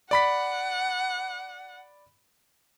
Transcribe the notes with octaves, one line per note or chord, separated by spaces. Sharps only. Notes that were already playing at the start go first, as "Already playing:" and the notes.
D5 F#5 B5 B6